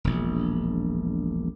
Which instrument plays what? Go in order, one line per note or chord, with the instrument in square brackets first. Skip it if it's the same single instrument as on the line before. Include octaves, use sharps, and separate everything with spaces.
[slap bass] E1 A#1